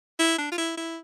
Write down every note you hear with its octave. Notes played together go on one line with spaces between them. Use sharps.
E4
D4
F4
E4
E4